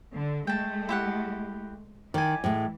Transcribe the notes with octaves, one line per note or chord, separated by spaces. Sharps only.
D3
G#3 A3 G5 A5
E4 G4 F#5
D#3 E3 D5 G#5
A2 G#3